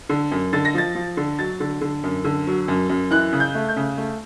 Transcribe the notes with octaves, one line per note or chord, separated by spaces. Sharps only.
D3
F#2
D3 A6
A#6
F3 A6
F3
D3
F#3 A6
D3
D3
F#2
D3
F#3
F#2
F#2
E3 F#6
C#3
G6
A3
G6
C#3
A3